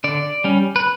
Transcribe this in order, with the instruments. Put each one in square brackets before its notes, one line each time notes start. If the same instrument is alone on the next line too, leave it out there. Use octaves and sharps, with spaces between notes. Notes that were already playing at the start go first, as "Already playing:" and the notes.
[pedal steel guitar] D3 D5
G3 C#4
B4